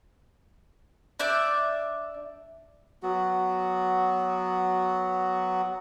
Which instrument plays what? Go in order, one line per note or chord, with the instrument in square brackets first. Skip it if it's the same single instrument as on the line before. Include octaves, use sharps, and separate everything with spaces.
[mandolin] D4 D5 E5 G6
[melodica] F#3 B3 F#4